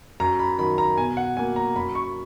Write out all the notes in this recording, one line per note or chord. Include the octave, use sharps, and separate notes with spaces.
F#2 A#5
B5
D#3 F#3 B5
A#5
B2 G#5
F#5
F#3 A#3 G#5
A#5
F#2 B5
C#6